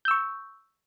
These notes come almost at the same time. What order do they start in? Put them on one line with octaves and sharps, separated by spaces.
G6 E6 C#6